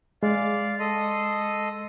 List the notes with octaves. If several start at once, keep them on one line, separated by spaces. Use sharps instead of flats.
G#3 D5 F5
A4 D#5 C6